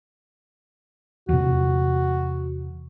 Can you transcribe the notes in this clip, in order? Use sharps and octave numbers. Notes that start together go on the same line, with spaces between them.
E2 C3 F#4